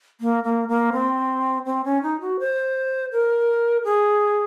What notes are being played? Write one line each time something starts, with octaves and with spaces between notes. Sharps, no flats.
A#3
A#3
A#3
C4
C4
C#4
D#4
F#4
C5
A#4
G#4